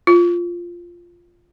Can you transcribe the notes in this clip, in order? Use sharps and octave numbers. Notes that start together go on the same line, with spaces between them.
F4